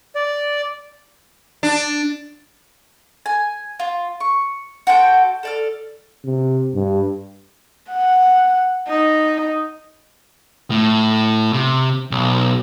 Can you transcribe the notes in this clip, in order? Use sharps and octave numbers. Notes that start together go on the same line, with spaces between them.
D5
D4
G#5
F4
C#6
F#4 A4 C5 G5
A4 D5 F6
C3
G2
F#5
D#4
A2
C3
B1